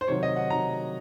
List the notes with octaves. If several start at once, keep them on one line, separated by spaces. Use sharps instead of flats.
C5
C3 D#3 F#3 C#5
D#5
F#5
C3 D#3 F#3 A#5